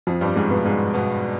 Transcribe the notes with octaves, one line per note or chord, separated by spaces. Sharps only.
F2 F3
G2 G3
G#2 G#3
B2 B3
G#2 G#3
B2 B3